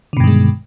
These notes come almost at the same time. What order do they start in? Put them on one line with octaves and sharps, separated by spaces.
D3 B2 G2 D#3 G#3